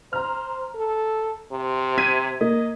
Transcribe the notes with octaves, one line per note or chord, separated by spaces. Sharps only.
C5 A#5 F6
A4
C3
G#6 B6 D#7
A#3 D#5